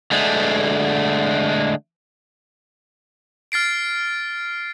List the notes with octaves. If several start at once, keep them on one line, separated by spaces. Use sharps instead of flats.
D3 G#3 A3
F6 A6 C7 D7